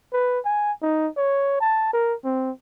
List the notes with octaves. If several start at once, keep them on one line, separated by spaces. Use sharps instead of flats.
B4
G#5
D#4
C#5
A5
A#4
C4